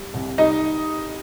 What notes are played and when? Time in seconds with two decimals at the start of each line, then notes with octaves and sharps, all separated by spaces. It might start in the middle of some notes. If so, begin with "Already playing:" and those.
Already playing: G3
0.14 C2
0.38 G3 D#4 D#5